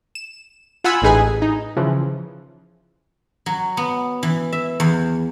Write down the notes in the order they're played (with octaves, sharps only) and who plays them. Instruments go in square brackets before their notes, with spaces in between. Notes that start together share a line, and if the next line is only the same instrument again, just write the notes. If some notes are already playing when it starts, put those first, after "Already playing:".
[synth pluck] E7
F4 F#5 G#5 B5 E6
A1 A2 D#4 G#4 B4 G#5
D#4
C#3 E3 F3
[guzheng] F#3
B3
E3
E5
E2